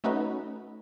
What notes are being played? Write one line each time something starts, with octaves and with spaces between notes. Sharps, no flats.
A3 C#4 D#4 F#4 B4